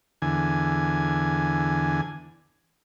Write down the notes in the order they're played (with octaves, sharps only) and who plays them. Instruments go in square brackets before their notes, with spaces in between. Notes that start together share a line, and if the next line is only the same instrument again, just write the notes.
[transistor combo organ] E2 D3 G#5